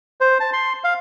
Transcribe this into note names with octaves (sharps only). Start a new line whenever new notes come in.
C5
A5
C6
F5